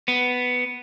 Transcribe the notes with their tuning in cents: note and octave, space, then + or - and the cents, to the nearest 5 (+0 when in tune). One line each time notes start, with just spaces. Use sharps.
B3 +5